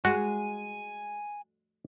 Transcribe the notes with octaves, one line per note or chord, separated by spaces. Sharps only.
G#3 F#4 G#5